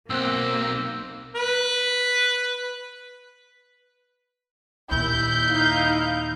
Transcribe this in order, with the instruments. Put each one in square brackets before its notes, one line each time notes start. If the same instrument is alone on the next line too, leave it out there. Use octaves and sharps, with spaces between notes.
[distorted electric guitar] B1 [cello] A#3 [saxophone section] C4 [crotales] E6 F#6
[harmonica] B4
[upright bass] D#2 A#2 [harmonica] E4 [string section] G6
[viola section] D#4 F5